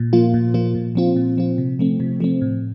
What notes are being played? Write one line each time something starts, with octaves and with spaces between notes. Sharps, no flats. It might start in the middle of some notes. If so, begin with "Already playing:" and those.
Already playing: A#2
F3 A#3 F4
A#2
F3 A#3 F4
A#2
F3 C4 F4
A#2
F3 C4 F4
C3
F3 A3 C4
C3
F3 A3 C4
A2